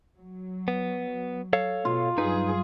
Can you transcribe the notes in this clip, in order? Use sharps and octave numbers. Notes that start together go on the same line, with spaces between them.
F#3
B3
A4 C#5 F5
B2 F4
G2 F#3 D#4 G#4 B4